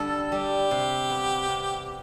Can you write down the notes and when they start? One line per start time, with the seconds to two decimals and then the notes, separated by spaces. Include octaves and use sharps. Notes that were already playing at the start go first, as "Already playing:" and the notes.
Already playing: D3 G3 A4
0.32 G3 G4
0.71 C3
1.10 B3
1.49 C3